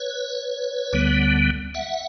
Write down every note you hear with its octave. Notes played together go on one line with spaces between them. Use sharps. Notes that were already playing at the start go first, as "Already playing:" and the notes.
Already playing: B4 C#5
D2 D3 G3 B3
E5 F#5